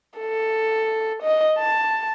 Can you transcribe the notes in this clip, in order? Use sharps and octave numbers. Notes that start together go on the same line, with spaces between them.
A4
D#5
A5